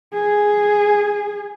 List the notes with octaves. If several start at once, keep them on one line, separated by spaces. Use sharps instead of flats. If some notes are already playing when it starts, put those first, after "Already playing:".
G#4